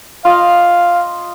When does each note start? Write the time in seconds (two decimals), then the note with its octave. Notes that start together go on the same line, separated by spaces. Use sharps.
0.25 F4 D#5 F5